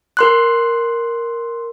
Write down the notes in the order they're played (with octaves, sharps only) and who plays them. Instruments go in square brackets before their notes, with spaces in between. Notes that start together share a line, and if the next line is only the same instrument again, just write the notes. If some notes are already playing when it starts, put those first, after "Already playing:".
[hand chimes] A#4 C6 F#6